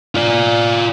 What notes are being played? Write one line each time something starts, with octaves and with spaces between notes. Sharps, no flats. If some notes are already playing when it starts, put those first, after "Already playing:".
F4 D5